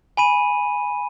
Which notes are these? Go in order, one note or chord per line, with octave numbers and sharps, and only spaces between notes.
G#5 B5 D#7